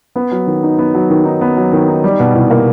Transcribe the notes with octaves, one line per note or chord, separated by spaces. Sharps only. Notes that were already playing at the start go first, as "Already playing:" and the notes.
B3
F#3
D#3
D#4
B3
F#3
D#3
D#4
B3
F#3
D#3
D#4
G3
B2
C2
A#3